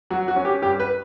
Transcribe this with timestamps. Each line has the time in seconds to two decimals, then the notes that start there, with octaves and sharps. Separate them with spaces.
0.10 F#3 F#4
0.28 F#4
0.36 C#4
0.45 G4
0.62 G2 G4
0.80 B4